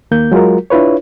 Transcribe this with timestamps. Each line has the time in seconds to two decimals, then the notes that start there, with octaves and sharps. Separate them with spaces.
0.11 D#2 A#3 G6
0.32 F#3 G#3 F4 F#4 A#4
0.70 D4 E4 F4 B4 C#5